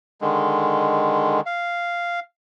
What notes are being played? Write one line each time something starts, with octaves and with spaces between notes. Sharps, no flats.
D3 D#3 G#3
F5